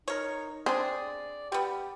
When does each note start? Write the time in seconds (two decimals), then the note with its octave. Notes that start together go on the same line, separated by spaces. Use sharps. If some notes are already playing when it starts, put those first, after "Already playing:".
0.08 D#4 A#4 C#5
0.66 C4 D4 G#4 D5
1.52 G3 B3 G4